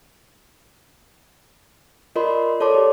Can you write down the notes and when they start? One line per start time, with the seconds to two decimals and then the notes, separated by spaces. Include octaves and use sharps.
2.16 F4 A#4 D5 D#5 B5 C6
2.60 A4 C#5 D5 A5 C6 D6
2.74 G4 A4